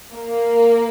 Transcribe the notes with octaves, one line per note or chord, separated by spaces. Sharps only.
A#3